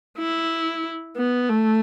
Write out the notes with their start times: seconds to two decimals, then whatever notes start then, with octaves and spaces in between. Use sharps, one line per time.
0.18 E4
1.16 B3
1.50 A3